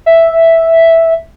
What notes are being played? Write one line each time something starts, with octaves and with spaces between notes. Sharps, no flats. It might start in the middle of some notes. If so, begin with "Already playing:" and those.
E5